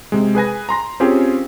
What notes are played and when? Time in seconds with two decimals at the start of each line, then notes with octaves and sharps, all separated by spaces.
0.12 C3 G#3
0.35 G#4 B4 G#5 A#6
0.69 A#5 C6 A#6
1.00 C4 C#4 F4 G4 G#4 A#4